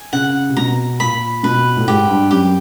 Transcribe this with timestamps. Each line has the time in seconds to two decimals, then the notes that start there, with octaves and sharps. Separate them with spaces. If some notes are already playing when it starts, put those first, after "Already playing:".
Already playing: G#5
0.13 C#3 F#5
0.49 C3
0.57 B2 A#5
1.00 A#2 B5
1.43 B2 B4
1.76 A2
1.87 G#2 G4
2.09 G2
2.31 F#2 G4